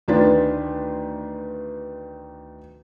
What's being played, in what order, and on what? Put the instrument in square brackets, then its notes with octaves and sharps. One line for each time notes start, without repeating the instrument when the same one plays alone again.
[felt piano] D2 D#3 D4 F4 B4 A6